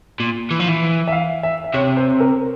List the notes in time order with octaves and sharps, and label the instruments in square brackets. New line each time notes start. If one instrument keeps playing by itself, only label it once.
[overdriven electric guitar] A#2
E3
F3
E3
[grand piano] E5
F5
E5
E5
[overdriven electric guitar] C3 [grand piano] C#5
[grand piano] C5
A#4